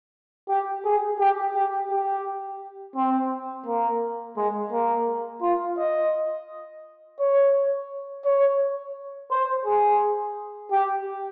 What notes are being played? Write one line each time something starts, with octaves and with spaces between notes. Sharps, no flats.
G4
G#4
G4
G4
G4
C4
A#3
G#3
A#3
F4
D#5
C#5
C#5
C5
G#4
G4